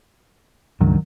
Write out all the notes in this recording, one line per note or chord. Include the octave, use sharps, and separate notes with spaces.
C#2 G2 D#3 F#3